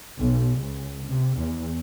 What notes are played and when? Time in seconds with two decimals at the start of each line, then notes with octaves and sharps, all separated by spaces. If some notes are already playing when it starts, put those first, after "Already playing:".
0.18 B1
0.58 C#2
1.06 C3
1.39 E2